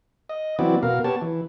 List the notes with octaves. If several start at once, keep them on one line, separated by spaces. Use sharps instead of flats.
D#5
E3 F#3 B3 C4 E4 D5
B2 A#4 F5
B3 G4 C#5 A5
E3